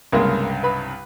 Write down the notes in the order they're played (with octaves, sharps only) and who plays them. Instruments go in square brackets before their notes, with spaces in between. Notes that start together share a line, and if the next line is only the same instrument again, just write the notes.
[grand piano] C2 G2 C#3 [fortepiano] G#3 A#3 A#4
[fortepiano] B4 B5